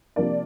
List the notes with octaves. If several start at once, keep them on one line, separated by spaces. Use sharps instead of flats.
C3 F3 A#3 D4 D5